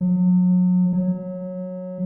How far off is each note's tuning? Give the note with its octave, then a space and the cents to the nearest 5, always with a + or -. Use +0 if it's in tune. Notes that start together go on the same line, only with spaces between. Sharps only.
F#3 -35
F#3 -15